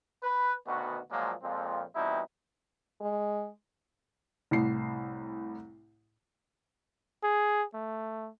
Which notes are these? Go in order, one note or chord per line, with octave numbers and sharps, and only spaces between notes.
B4
D2 B2 D#3 B3 F#4
A#2 F3 F#3 G#3 A#3
F2 A#2 F3 G#3 C4 F4
B2 E3 G3 C4 D#4 E4
G#3
C2 A2 C7
G#4
A3